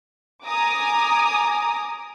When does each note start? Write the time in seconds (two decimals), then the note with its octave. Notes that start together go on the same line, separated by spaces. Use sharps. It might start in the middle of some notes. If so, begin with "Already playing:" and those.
0.45 G#5 A#5 D6 D#6